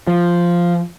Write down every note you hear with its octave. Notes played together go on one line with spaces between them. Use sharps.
F3